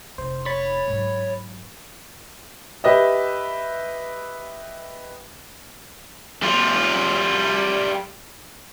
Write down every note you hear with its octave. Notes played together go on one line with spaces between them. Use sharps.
F1 D#4 C5
C#5 B5 A6
G#2 F#3
G4 B4 D#5 E5
G3 F4